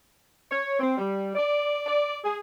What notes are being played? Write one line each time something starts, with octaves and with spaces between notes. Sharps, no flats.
C#5
C4
G3
D5
D5
G#4